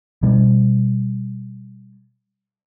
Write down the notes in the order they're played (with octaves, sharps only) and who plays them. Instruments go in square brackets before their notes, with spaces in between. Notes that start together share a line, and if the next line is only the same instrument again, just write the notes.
[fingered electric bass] B2 G3